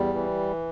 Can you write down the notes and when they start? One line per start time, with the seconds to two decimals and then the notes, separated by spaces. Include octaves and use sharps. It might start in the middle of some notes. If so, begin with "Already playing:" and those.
Already playing: E2 G3
0.13 E3